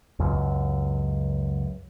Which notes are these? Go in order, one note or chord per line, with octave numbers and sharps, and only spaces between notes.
C#2 F#2